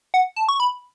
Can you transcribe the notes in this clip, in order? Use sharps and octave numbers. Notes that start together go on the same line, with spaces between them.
F#5
A5
C#6
B5